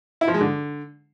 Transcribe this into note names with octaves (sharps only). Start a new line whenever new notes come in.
E4
F3
G#3
D3